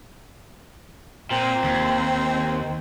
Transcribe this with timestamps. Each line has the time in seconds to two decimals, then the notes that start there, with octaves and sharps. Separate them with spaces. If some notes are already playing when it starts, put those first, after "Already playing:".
1.31 A#2 C4
1.64 D#2